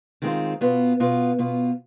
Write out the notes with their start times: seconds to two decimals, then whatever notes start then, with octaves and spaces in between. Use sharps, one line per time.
0.22 D#3 G#3 C4 F4
0.61 B2 B3 F4
1.00 B2 B3 F4
1.38 B2 B3 F4